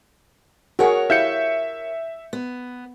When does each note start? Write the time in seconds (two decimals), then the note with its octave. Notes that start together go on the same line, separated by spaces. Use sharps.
0.79 F#4 G#4 A#4 C#5 F#5
1.10 E4 G4 E5 F5 G6 C#7
2.33 B3